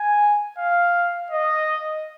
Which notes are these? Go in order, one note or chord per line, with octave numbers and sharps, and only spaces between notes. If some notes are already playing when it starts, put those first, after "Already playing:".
Already playing: G#5
F5
D#5